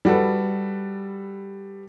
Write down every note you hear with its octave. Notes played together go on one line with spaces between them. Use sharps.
G3 F#4 A4 B4